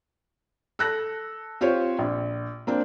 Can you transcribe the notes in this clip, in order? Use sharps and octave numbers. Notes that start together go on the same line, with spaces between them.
A4 F#6 A#6
C4 F4 G4 C5 C#5
A#1
A#3 C4 D4